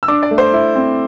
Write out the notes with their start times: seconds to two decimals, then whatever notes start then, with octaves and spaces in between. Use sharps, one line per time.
0.03 E6
0.08 D4 D6
0.23 D5
0.31 A3
0.38 C5
0.54 E4
0.75 C4